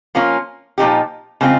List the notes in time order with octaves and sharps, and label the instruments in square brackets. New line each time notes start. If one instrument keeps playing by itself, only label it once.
[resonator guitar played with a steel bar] F3 A#3 C#4 F4
A#2 F3 A#3 D#4 G4
C#3 G#3 C4 F4